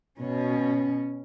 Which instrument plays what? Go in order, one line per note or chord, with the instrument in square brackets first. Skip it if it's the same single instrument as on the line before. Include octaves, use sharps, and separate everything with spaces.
[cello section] B2 C#4